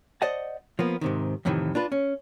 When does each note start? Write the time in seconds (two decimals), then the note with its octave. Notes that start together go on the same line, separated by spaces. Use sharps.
0.22 C5 D5 D#5 F#5 A5
0.79 F3 A#3 B3
1.01 G#2 C3 D#3
1.45 F2 A2 C3 D#3 E3
1.75 D4 F4 B4
1.92 C#4